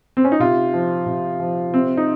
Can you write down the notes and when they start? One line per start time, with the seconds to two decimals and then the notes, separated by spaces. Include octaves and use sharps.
0.17 C4
0.24 C#4
0.32 D#4
0.40 C3 F4
0.74 F3
1.06 C3
1.40 F3
1.73 C3 C4
1.97 D#4